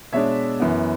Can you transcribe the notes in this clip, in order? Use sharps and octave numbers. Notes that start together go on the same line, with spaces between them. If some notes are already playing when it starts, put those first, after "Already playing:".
B2 G#3 D4 C#5 E5
F#2 E3 B3